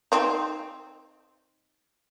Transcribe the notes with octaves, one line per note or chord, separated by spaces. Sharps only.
C4 D#4